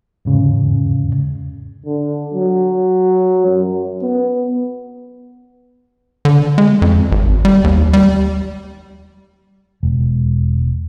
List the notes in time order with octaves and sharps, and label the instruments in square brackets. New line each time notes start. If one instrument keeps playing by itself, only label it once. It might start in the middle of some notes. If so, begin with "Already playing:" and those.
[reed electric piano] E2 G#2 C#3
[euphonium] D3
F#3
F#2
B3
[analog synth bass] D3
G#3
F2
G#1
G3
D#2
G3
[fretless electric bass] E1